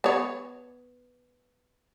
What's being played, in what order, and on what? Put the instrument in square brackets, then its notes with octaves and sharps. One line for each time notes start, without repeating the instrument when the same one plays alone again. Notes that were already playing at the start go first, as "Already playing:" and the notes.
[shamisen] B3 C#5